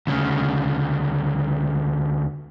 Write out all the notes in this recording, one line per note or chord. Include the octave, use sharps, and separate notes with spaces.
D2 C#3